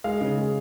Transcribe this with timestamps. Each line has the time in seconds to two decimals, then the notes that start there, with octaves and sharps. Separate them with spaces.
0.04 G#3 F5
0.21 C#3
0.38 G#3